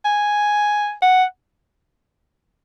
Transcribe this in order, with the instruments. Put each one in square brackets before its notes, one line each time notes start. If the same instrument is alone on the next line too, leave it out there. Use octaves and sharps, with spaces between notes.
[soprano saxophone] G#5
F#5